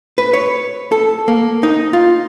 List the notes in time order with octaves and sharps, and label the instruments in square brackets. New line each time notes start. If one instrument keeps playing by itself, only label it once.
[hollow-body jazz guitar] B4
C#5
A4
A#3
D#4
F4